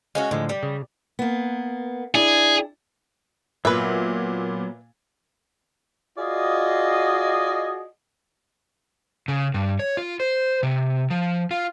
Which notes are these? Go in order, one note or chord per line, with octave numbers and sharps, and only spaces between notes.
G#3 C#4 F#4 F5
A2 D3 F3 G#3
G3
C#3
A#3 B3
D4 E4 G#4
A#2 F#3 B3 B4 E5
F4 F#4 G#4 D5 D#5
C#3
G2
C#5
F4
C5
C3
F3
F4